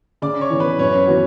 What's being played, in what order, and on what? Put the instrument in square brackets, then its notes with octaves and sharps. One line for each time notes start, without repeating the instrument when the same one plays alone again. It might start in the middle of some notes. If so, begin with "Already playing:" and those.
[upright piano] C#3 [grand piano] D5 D6
[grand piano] C#5 C#6
[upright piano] E3 B3
[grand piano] B4 B5
[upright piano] F#2 [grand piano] C#4 C#5
[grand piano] B4
[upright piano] E3 B3 F#4